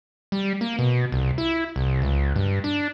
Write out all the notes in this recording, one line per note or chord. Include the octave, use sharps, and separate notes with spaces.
G3
A#3
B2
C2
E4
C2
C#2
G2
D4